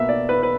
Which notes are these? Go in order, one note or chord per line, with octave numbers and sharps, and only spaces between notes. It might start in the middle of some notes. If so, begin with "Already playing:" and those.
Already playing: B2 A#3 E5
D5
B4
B4